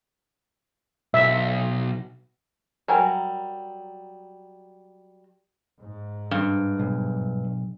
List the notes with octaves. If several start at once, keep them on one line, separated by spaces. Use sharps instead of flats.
B1 E5
F#3 G3 A#4 G#5
G#2
G2
B1